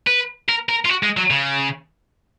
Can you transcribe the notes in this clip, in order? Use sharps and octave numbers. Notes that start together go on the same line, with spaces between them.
B4
A#4
A#4
F4
F#4
G#3
F#3
C#3